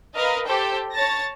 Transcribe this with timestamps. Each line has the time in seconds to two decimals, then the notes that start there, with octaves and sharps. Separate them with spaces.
0.16 A#4 B4 D#5 F5
0.46 G4 A4 C5 G5
0.93 C#5 A5 A6 A#6